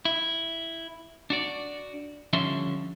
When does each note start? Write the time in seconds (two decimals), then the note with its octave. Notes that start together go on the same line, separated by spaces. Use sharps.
0.05 E4
1.30 D4 F#4 D5
2.33 D3 F3 G3 C#4 E5 C6